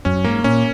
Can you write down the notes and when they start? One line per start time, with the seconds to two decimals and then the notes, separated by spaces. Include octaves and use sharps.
0.05 F#2 C#4
0.24 G#2 A#3
0.44 A#2 C#4